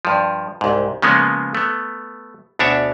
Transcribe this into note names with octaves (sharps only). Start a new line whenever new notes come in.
G2 F3
C2 G#2
C#3 F3 G#3 A#3 B3 C#4
A3 B3
D2 B2 D4 C#5 E5